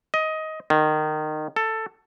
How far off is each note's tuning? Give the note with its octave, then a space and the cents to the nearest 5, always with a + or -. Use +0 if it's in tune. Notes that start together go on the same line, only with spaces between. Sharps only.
D#5 +15
D#3 -20
A4 +10